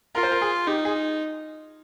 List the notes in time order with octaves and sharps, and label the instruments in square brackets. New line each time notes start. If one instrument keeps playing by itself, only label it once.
[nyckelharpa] F4 [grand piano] A#4
[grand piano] C5
A#4
G#4
[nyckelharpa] D#4 [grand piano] G4
[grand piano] G#4